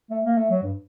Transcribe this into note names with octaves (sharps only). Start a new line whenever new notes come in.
A3
A#3
A3
F#3
G2